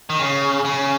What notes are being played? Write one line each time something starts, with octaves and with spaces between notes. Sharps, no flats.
D#3
C#3
C#3